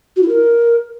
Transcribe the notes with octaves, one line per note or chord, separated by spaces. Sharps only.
F#4
E4
A#4